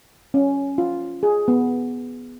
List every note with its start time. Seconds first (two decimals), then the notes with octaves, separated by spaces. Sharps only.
0.34 C#4
0.78 F4
1.23 G#4
1.48 B3